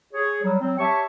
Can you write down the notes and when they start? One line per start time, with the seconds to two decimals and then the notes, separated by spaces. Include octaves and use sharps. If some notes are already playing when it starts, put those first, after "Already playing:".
0.14 G#4 C#5
0.43 F#3 G3
0.60 F#3 C4
0.79 G4 C#5 E5 A5 C#6